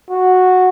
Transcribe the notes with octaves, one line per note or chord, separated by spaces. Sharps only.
F#4